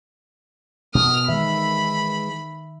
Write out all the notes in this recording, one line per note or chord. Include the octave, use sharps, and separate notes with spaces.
B2 D#6 F6
D#3 E3 G#3 E5 B5